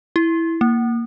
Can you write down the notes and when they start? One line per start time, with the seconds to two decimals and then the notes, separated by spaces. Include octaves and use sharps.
0.16 E4
0.61 A#3